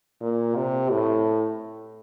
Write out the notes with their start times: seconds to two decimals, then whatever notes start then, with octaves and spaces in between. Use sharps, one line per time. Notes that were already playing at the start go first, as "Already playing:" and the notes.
0.21 A#2
0.56 C3
0.91 A2